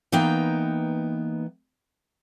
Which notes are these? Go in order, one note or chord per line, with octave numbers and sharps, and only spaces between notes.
E3 A#3 B3 D#4 G5